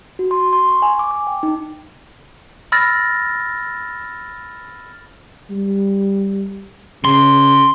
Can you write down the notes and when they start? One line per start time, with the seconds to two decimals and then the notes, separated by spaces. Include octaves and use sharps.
0.19 F#4
0.31 C6
0.53 C6
0.69 C#6
0.82 G#5
0.99 D6
1.11 D6
1.27 G5
1.43 D#4
2.72 B5 E6 F6 A6 A#6
5.50 G3
7.05 C#3 C6